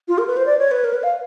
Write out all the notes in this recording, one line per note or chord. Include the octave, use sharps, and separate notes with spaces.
F4
A#4
B4
C5
D5
C#5
B4
A#4
B4
F5